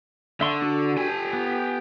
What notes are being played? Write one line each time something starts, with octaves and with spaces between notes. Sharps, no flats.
D3 E5 C6 C#6
D4 F#4 A4
G4 G#5
B3